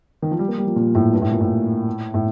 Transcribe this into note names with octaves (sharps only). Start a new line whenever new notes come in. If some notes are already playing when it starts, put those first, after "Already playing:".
D#3
F3
G3
A#3
G3
F3
A#2
A2
G2
A2
A#2
A2
A2